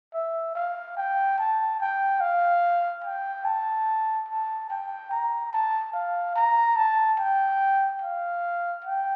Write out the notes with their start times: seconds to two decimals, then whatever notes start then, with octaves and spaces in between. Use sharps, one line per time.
0.14 E5
0.55 F5
0.97 G5
1.38 A5
1.80 G5
2.21 F5
3.04 G5
3.45 A5
4.29 A5
4.70 G5
5.11 A#5
5.53 A5
5.93 F5
6.35 A#5
6.76 A5
7.19 G5
8.02 F5
8.85 G5